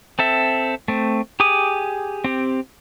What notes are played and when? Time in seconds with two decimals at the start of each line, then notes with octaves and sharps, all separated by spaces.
0.19 C4 A4 E5
0.88 A3 C4
1.40 G4 G#4 D6 D#6
2.24 C4 G4